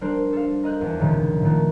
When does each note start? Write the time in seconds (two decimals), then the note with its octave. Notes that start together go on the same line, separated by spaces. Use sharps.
0.01 G3 D4 A#4 C5
0.33 A4 F5
0.63 A#4 D#5 F#6 G6
0.81 E2 D4
0.99 F1 C#2 A#2 D#3
1.43 A#2 D#3 A3 B3